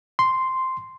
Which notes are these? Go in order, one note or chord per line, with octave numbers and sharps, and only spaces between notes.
C6